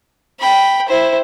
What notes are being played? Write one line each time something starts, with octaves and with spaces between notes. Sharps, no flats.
G5 B5
E4 C5